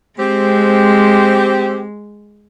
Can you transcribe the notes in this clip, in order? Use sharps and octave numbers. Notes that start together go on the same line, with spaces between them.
G#3 C4 G4